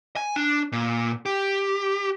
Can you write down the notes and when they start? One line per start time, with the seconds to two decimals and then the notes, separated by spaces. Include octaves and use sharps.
0.16 G#5
0.36 D4
0.72 A#2
1.26 G4